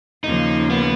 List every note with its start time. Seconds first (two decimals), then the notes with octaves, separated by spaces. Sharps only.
0.24 D#2 C#3 F3 A#3 D#4
0.70 B3